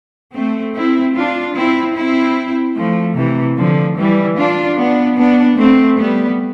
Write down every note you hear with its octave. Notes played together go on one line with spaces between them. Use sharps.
A3 C4
C4 E4
D4 F4
C4 E4
C4 E4
F3 A3
C3 E3
D3 F3
E3 G3
D4 F4
B3 D4
B3 D4
A3 C4
G3 B3